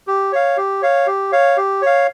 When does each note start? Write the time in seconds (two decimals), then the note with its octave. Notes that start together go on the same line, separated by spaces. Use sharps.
0.07 G4
0.32 C#5 F5
0.57 G4
0.82 C#5 F5
1.07 G4
1.32 C#5 F5
1.57 G4
1.82 C#5 F5